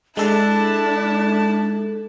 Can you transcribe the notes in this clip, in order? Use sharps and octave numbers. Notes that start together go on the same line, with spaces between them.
G#3 D4 E4 A4 A5